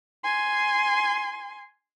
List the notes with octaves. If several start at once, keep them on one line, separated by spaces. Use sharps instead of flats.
G#5 C6